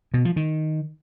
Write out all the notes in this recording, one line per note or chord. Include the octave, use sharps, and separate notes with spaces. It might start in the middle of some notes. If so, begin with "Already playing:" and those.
B2
F3
D#3